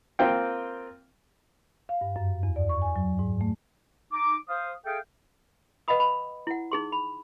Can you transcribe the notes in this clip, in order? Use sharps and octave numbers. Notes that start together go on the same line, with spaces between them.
A#3 C4 F4 G5
F5
G2
F#2
E2
D5
C#6
G#5
F#3
G#2
A3
D#4 D6
C5 F5 D#6
G#4 A4 E5 F5 G5
B4 D#5 F5 F#5 B5 D#6
B5
E4 F#5
D#4 G#4 C6
B5